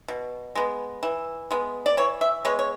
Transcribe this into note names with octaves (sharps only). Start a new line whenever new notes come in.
B2
G#3 B3
E3
G#3 B3
D5
E3 C#5
E5
G#3 B3 C#5
C#5